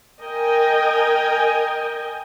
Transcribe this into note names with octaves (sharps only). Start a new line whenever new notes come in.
A#4 D#5 G5 G#5